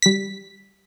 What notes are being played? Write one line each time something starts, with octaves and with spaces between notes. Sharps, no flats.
G3 B6